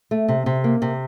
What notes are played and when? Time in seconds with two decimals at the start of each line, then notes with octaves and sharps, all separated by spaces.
0.11 A3
0.28 C3
0.46 C3
0.64 A#3
0.82 C3